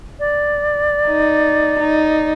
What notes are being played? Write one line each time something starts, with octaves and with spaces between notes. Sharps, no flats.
D5
D#4
D#4